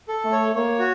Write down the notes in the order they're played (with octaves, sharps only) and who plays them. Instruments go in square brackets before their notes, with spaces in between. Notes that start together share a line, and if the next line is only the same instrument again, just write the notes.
[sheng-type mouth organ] A4
[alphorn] A3
[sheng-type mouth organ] C#5
[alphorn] A#3 [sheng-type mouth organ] C#5
[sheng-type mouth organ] F#4